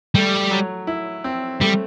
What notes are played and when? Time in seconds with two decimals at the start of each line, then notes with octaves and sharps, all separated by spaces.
0.15 G3 A3
0.51 F#3
0.87 E4
1.24 C4
1.61 G3 A3